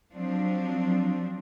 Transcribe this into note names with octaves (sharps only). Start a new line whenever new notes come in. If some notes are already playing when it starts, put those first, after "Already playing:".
F3 F#3 C4 D4